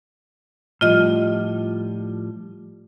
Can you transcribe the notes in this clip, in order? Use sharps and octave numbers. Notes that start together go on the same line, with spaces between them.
A2 F3 G3 F4 D#5 F6